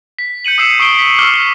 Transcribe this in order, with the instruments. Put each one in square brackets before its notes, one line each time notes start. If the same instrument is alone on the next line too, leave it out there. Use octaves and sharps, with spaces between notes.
[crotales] B6
G6 C#7 D#7 F#7
D#6 E6 C7 C#7 E7
C#6 D#6 C7 D7 D#7 G7
B6
C#6 D6 E6 F6 E7 G7